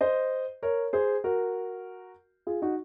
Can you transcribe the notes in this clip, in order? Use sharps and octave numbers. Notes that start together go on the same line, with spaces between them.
C5 D#5
A#4 C#5
G#4 C5
F#4 A#4
F4 G#4
D#4 F#4